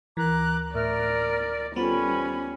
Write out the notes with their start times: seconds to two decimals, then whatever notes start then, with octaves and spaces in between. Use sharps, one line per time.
0.17 D2 E3 A#4 A#5 D6 F#6
0.75 A2 A#4 D5 E5 F6
1.76 G3 B3 C#4 F4 A4 C5 B5